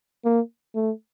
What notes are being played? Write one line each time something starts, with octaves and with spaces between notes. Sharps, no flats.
A#3
A3